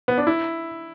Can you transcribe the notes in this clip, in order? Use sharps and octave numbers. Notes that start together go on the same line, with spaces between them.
B3
D4
E4